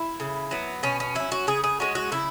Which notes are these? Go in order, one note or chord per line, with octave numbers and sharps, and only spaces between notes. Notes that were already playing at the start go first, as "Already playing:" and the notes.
Already playing: E4
C#3
F#3 B3
B2 C#4
C#4
F#3 C#4 E4
F#4
C#3 G#4
G#4
G#3 C#4 F#4
F#4
C#3 E4